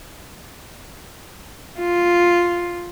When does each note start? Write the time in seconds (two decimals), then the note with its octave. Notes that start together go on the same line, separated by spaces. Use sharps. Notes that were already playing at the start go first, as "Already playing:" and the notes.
1.79 F4